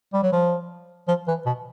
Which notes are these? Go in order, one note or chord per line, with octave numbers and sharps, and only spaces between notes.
G3
F#3
F3
F3
E3
B2